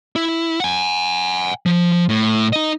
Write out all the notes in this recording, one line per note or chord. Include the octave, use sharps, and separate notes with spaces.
E4
F#5 G#5
F3
A2
D#4 D#5